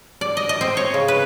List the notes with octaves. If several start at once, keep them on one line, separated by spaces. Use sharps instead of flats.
D5
D#5
D#5
C4
C#5
C#3
B4